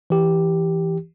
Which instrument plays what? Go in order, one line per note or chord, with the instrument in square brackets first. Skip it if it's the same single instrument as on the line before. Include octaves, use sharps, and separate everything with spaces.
[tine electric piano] E3 G4